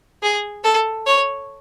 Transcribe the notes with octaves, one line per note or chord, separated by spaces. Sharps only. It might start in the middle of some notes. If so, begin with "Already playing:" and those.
G#4
A4
C#5